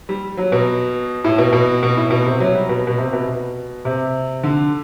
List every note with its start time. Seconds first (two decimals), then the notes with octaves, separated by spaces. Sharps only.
0.09 G3
0.37 F#3
0.52 B2
1.24 A2
1.38 B2
1.53 B2
1.83 B2
1.97 A2
2.11 B2
2.26 C3
2.40 F#3
2.54 G3
2.69 B2
2.87 B2
2.98 C3
3.13 B2
3.27 B2
3.85 C3
4.43 D3